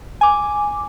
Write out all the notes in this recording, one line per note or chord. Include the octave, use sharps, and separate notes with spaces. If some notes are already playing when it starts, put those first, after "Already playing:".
G#5 D6